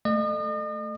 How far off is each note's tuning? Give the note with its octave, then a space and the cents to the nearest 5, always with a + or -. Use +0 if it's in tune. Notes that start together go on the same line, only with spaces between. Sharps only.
A3 +0 D#5 -40